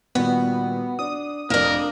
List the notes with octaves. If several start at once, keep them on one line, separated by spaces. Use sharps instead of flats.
A#2 D#3 G3 B3 F#4
D4 D#6
F1 F2 A#3 D4 A#4